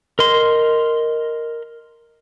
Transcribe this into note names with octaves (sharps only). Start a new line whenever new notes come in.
A#4 D#5 C6